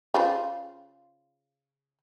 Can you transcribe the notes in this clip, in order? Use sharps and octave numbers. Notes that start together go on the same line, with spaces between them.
C#3 F4 C5